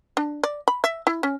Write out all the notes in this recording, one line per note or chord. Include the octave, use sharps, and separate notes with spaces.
D4
D5
B5
E5
E4
C#4